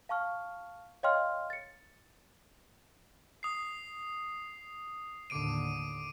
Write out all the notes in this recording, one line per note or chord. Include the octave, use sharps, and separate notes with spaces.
F5 A5 C#6 F6
C#5 D#5 F5 G5 C6 F6
A6 C#7
D#6 C7
D#2 A2 D3 D6 D7 D#7